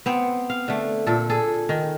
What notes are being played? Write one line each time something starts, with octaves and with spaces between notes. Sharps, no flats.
B3 C4
F5
D3 A3
A#2 A4
G#4 A4
D#3